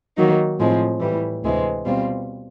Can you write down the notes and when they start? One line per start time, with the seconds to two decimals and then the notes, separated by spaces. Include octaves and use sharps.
0.17 D#3 F#3 A#3 D#4
0.59 A2 F3 G#3 C4
1.01 A2 E3 G3
1.44 D2 C3 E3 G#3 C4
1.86 B2 G3 C4 F4